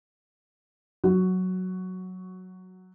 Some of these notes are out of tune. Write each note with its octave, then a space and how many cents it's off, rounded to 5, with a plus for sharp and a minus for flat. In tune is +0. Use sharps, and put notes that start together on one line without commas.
F#3 +0 F#4 +5